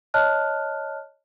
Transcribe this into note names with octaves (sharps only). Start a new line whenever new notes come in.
C#5 D#5 A5 F6 F#6